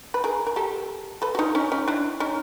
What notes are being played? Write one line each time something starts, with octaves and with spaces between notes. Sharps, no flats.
B4
G#4 A#4
A#4
G4 A4
A4 B4
F#4
D#4 F4
C#4 D#4
C#4 D#4
D4 E4
C#4 D#4